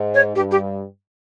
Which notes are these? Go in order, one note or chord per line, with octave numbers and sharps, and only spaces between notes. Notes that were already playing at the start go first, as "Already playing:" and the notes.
Already playing: G#2
C#5
G2 G4
G4